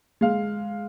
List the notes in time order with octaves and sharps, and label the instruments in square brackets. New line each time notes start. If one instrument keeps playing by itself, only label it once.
[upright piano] G#3 F5